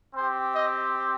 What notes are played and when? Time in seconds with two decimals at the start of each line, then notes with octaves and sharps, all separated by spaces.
0.15 C4 G4 C5
0.53 D#5